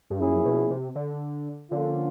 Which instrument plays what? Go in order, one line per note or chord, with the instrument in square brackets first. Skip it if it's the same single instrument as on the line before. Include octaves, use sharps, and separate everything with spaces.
[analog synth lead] G2
[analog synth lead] F#2 [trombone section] F3 A#3 C#4 E4 G#4
[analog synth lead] B2
C3
D3
[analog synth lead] D3 [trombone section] F3 A#3 C#4 F4